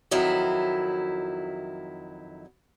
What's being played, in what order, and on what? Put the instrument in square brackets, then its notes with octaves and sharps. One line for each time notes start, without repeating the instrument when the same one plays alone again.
[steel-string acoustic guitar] F2 D#3 F#3 E4